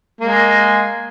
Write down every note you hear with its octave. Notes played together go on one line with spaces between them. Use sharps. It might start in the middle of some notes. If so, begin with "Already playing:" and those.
G#3 A#3